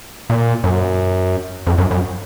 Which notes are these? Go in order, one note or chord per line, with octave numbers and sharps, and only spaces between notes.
A#2
F#2
F2
F#2
F#2